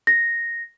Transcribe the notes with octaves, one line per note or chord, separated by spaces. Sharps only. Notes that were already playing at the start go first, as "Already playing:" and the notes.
A#6